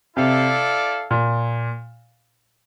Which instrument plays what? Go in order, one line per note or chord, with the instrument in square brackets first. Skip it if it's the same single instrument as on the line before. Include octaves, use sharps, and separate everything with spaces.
[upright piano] C3 [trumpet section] E4 A4 D5 F5
[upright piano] A#2